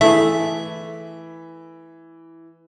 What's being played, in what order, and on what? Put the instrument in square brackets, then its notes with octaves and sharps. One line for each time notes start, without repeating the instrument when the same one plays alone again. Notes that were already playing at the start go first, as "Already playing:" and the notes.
[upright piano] E3 [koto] A3 E4 G#4 [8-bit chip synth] E5